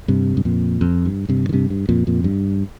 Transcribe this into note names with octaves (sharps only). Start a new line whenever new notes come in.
G2 C3
G2
F2 A#2
F2
G2
G2 C3
D#3
G2 C3
G2
F2 A#2
F2 A#2
G2